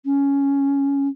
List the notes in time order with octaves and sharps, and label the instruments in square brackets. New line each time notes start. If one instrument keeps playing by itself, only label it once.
[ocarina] C#4